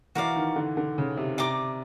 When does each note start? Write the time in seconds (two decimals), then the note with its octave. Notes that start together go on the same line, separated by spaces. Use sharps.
0.15 E3 F#4 A#4 D5 F5
0.36 D#3
0.56 D3
0.77 D3
0.98 C#3
1.17 C3
1.38 C3 D5 G5 A#5 D6